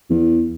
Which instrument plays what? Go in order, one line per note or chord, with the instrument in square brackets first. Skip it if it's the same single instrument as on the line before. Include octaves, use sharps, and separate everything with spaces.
[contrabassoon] E2